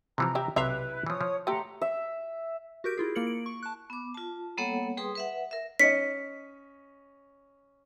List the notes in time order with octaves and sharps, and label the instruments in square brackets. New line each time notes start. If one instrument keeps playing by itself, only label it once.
[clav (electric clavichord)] C3 E3 F3 [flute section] A#5
[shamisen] G4 E5
[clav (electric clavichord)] B1 C3 F5 [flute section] E4 B4 [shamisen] E5
[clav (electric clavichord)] E3 F3 [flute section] C#5 D#6
[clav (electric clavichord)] F3
[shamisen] A3 G4 [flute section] F#5 A#5 C6
[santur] E5
[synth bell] F#4 G4 A#4 G6 D7
E4 F4 G#4
A#3 E4 A#4 C#7 F#7
D7
C#6
A5 F#6
[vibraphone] B3 D6
F4 A5
G3 A#3 B3 A4 C#5 F#5
G3 G#4 B4 G5 C6 D#6
B4 E5 F#5
A#4 E5
[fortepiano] C#4 D#5 [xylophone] B6 C#7